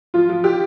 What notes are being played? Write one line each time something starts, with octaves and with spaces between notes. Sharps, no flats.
F3 F4
F3
G4